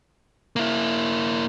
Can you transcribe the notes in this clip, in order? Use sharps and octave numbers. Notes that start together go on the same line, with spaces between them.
A#3 E4